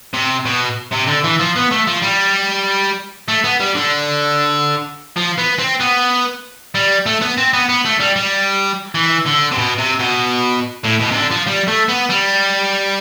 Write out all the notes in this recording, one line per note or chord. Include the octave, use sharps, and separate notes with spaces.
C3
B2
C3
D3
E3
F3
B3
A3
F3
G3
A3
B3
G3
D3
F3
B3
C4
B3
G3
A3
B3
C4
B3
B3
A3
G3
G3
E3
D3
C3
B2
C3
B2
A2
B2
C3
D3
F3
G3
A3
B3
G3